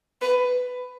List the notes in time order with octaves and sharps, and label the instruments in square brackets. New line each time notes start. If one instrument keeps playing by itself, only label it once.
[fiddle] B4